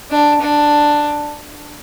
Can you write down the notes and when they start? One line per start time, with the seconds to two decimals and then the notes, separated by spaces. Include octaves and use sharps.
0.11 D4
0.41 D4